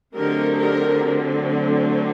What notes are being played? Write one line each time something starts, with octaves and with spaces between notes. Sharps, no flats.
D3 F#3 A3 C4 D#4 G4 A#4
G4 A#4